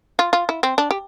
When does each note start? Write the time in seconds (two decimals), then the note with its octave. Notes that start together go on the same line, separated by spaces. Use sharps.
0.19 F4
0.33 F4
0.49 E4
0.63 C4
0.78 D4
0.91 G4